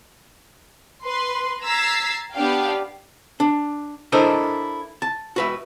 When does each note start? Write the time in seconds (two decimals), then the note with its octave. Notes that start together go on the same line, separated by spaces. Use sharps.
1.05 B4 C6
1.63 A#5 E6 G#6 A6 B6 C7
2.34 B3 D4 G4 F5 G5
3.40 D4
4.12 D4 E4 A4 A#4 C5 D#5
5.02 A5
5.36 F#4 B4 E5